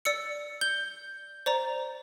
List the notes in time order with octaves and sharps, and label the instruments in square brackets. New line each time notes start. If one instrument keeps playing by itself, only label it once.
[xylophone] D5 E6 C#7
G6 G7
C5 D5 A#5